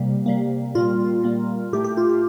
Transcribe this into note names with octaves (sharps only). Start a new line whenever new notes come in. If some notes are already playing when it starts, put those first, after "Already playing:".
Already playing: C3 G3 A#3
C3 G3 A#3
A#2 G3 A#3 F4
A#2 G3 A#3
A2 A3 G4
G4
F4
G4